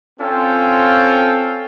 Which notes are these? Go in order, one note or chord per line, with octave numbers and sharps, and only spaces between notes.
C4 C#4 F4 A4 G5